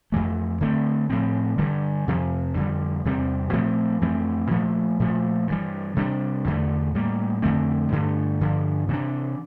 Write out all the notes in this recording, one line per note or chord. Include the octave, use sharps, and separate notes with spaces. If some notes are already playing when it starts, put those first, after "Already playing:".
F2 E3 A3
D3 A3 C4
A2 F3 C4
G2 D3 G3
F2 C3 F3
F2 D3 G3
E2 C3 G3 C4
A#2 F3 A3 C4
F2 E3 A3 C4
A#2 F3 A3
A#2 F3 A3
G2 E3 G3
C3 G3 D4
E2 D3 A3
A2 G3 A#3
F2 D3 A3 C4
G2 D3 A3
G2 D3 F3
C3 E3 A3 D4